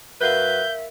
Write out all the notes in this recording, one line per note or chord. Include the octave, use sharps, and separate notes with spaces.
F#2 F#4 A#4 B4 E5 F5 G6 G7